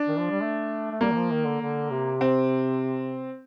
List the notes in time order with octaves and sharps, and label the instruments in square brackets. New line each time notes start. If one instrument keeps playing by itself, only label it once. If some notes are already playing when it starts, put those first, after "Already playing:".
Already playing: [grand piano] D4
[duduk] D#3
F3
G3
A3
A3
[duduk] G3 [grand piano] A#3
[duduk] D#3
F3
D#3
D3
D3
C3
[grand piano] C4